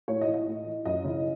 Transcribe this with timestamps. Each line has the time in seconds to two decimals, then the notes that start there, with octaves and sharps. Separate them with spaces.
0.08 A2 C#5
0.21 D#5
0.27 E3
0.34 D#5
0.47 A2
0.67 E3
0.85 F#2 D#5
1.04 C#3 E3